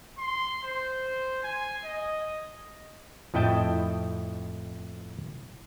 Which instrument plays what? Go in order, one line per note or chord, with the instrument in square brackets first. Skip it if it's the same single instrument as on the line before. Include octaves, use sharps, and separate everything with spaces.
[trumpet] C6
C5
G#5
D#5
[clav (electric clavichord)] F2 A2 E4 D#5 G5 A5